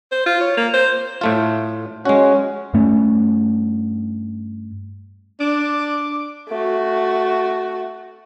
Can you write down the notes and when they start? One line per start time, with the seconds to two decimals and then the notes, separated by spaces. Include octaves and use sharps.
0.12 C5
0.26 F4
0.40 C#5
0.57 A#3
0.74 C5
1.21 A2 A3 F4
2.05 G#3 C#4 F#4
2.74 G2 A3 C#4
5.40 D4 D6
6.49 A3 F#4